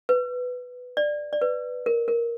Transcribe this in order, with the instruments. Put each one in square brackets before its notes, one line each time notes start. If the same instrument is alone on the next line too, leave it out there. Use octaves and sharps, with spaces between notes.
[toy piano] B4
D5
D5
B4
A#4
A#4